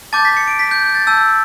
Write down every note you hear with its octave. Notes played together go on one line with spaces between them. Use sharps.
A5 D6 G6 A6
B6
C#7
D7
B6
G6
G6
A6
A5 E6 G6